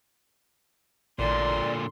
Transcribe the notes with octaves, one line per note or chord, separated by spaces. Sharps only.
A1 A#2 D3 D5 C6